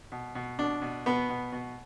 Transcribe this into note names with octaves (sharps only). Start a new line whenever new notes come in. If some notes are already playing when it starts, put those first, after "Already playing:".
B2
B2
B2 D4
B2
B2 B3
B2
B2